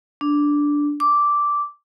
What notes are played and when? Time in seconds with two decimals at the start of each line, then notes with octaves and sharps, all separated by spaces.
0.21 D4
1.00 D6